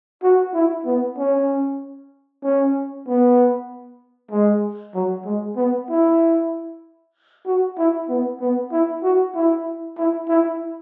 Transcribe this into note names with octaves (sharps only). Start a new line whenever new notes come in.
F#4
E4
B3
C#4
C#4
B3
G#3
F#3
G#3
B3
E4
F#4
E4
B3
B3
E4
F#4
E4
E4
E4